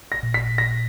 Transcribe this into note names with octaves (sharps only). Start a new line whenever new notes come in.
A#6
A#2
B6
A#6